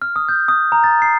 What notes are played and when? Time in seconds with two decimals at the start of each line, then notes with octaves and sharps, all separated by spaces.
0.02 F6
0.16 D#6
0.28 G6
0.48 D#6
0.72 A#5
0.84 A6
1.02 C7